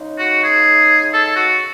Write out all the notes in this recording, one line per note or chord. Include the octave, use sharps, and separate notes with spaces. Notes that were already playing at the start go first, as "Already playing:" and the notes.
Already playing: C#3 G#3 D#4
F#4
G#4
A4
F#4